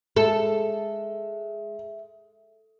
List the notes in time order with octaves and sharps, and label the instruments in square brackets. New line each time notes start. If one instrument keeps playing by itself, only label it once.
[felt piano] G#3 [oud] A4 [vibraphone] E5